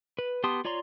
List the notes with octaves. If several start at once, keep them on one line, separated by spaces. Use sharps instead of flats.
B4
B3 G4 A5 C6 D#6
F4 C#5 D5 A#5 C6